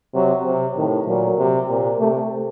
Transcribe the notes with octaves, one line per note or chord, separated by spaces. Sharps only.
C3 F#3
C3
A2 D#3
A#2 F#3
C3
A#2
C3 A3